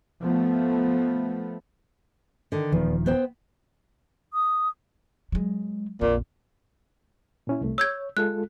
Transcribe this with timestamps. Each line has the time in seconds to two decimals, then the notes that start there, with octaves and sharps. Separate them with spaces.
0.22 F3 A3 B3
2.52 D3 D#3
2.72 D#1 E2 D#3 F3
3.06 B3 C5 G5
4.34 D#6
5.32 F#3 G#3
6.01 A#1 F2 A#2
7.47 A#2 C#4 E4
7.61 C2 A3
7.78 C#5 E6 G6 G#6
8.17 G#3 F4 A4 F#6